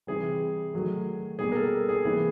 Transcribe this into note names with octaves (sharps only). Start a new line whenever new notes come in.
C3 E3 G3 G#4
D#3 F#3 A3
B2 G3 A#3 G#4
A#4
A4
G#4
C3 E3 G3 A#3 G#4